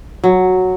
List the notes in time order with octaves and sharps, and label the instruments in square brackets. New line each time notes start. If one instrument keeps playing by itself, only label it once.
[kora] F#3